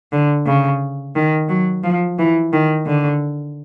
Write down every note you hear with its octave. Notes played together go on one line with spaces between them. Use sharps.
D3
C#3
D#3
F#3
F3
E3
D#3
D3